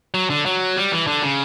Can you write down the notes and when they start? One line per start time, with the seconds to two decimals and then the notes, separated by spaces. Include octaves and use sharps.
0.14 F#3
0.30 D3
0.46 F#3
0.76 G3
0.92 E3
1.07 D3
1.23 C#3